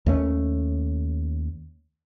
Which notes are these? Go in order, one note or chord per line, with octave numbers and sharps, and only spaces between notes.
D#2 A3 C#4